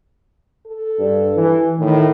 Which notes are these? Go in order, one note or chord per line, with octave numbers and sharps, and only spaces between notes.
A4
G2
E3
A2 D#3